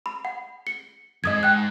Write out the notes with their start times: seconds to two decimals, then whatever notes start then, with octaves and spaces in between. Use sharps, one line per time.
0.06 B5
0.25 F#5
0.67 C#7
1.24 F2 G#2 D#5 D#6 G#6
1.43 G5 F#6